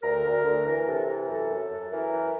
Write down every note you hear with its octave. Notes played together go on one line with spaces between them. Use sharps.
D2 A#4
D2
D2
E3 A#4
C3 A4
E3 A#4
F#2 A4
F#2
F#2
E3 A#4
E3